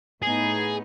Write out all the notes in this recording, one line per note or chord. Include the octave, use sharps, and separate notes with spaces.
A2 B3 D#4 G#4